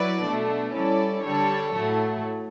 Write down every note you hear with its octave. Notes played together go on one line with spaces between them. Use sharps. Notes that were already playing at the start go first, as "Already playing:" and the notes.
Already playing: F#3 E4 B4 D5
B2 A3 D4
G3 C#4 E4 A4 D5
D3 G3 D4 A4 C#5
A2 F#3 A3